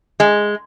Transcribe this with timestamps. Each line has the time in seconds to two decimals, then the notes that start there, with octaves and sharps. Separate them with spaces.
0.20 G#3